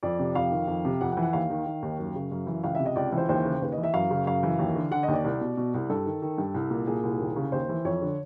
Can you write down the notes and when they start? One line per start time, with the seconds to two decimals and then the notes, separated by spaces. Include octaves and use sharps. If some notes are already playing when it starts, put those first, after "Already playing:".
0.03 F2 D5
0.19 C3
0.35 F2 F5
0.51 D#3
0.67 F2
0.85 C3
1.01 F2 F#5
1.12 F#5
1.17 E3
1.22 F#5
1.33 D#2 F5
1.50 D#3
1.66 D#3
1.82 D#2
1.99 F#2
2.15 C#3
2.32 F#2
2.47 E3
2.64 C#2 F5
2.75 C3 E5
2.86 D#5
2.96 C#2 D5
3.12 E3
3.17 C5
3.29 D#2 C5
3.45 C#3
3.62 D#2 B4
3.72 D#5
3.78 E3
3.83 E5
3.93 F#2 F5
4.10 C#3
4.26 F#2 F5
4.43 E3
4.59 D#2
4.75 D3
4.91 D3 F#5
5.03 D#2 D#5
5.13 D5
5.24 C2
5.41 B2
5.57 B2
5.74 C2
5.90 G2 A4
6.06 D#3
6.22 D#3
6.38 G2
6.54 C2
6.71 A#2
6.87 A#2 G#4
7.03 C2
7.20 D#2
7.36 C#3
7.52 D#2 C5
7.69 E3
7.85 F2 C#5
8.02 D3